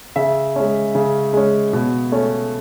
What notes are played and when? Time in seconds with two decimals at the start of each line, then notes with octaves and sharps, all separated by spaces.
0.16 C#3 E5
0.56 G#3 C#4
0.95 C#3
1.33 G#3 C#4
1.73 B2
2.12 A3 C#4